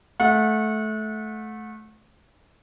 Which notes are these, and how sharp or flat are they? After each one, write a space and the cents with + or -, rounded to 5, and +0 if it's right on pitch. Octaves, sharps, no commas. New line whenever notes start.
A3 -20 F#5 -30